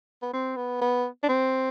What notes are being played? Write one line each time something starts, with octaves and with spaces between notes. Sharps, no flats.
B3
C4
B3
B3
D4
C4